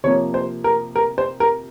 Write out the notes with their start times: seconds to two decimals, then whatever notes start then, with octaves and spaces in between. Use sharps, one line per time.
0.04 C3 F3 A#3 C#5
0.34 C5
0.64 A#4
0.96 A#4
1.18 C5
1.40 A#4